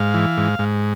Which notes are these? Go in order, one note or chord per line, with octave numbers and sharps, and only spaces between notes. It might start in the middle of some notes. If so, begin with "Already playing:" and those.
Already playing: G#2 F5
E3
G#2
G#2